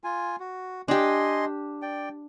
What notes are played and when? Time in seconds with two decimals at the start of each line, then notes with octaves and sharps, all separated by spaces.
0.04 F4 G#5
0.40 F#4
0.88 D4 G4 D#5 G#5 C6
1.82 D5 G5